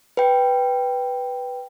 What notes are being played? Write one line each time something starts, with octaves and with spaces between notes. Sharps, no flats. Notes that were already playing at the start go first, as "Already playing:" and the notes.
B4 G5